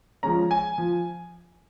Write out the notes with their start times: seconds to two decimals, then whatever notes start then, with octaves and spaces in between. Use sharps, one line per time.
0.23 F3 G#3 C#4 A#5
0.51 G#5
0.78 F3